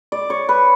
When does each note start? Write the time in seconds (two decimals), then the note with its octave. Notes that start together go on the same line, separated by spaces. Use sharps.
0.12 D5
0.30 C#5
0.49 B4